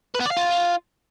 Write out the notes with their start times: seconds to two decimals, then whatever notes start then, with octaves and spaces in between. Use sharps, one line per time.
0.15 B4
0.20 B3
0.26 D5
0.31 F5
0.37 F4